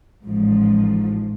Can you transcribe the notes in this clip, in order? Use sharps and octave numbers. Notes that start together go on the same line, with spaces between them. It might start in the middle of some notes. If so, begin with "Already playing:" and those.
A1 G#2 F3